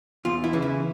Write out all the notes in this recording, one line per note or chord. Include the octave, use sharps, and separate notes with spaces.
E2 F4
E4
C#3 E3
E4